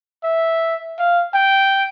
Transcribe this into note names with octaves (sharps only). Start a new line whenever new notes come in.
E5
F5
G5